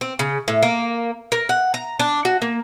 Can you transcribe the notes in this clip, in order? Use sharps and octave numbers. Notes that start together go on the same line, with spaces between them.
C4
C#3
A2
A#3
A#4
F#5
A#5
D4
F#4
A#3